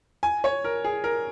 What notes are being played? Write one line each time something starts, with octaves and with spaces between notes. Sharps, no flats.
G#5
C#5
A#4
G#4
A#4